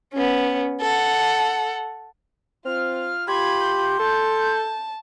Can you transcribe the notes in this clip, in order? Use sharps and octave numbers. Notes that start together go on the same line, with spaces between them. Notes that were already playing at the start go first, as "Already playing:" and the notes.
B3 C#4
A4 F#5
C4 F4 F6
F4 G4 B5 C6 G#6
G6
A4 A5